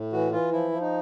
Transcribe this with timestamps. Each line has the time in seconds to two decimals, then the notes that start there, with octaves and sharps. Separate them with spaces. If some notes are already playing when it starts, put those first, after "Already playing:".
Already playing: A2
0.13 E3 F#4
0.32 E3 F4
0.52 F3 E4
0.72 F3
0.81 D#4